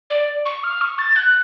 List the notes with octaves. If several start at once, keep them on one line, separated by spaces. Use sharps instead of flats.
D5
C#6
F6
C#6
A6
F#6